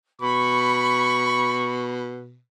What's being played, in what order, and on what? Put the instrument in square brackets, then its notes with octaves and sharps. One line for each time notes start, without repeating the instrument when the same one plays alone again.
[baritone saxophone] B2 [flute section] B5 [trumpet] C#6